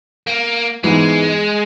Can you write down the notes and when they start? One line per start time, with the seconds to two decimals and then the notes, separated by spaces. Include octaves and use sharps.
0.27 A#3
0.83 G#2 E3 G#3 B3